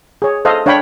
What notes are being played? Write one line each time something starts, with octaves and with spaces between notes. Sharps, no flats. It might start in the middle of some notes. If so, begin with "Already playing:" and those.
G#4 C#5
A4 C5 D#5 F5
D4 C#5 F5 G5 B5 C#6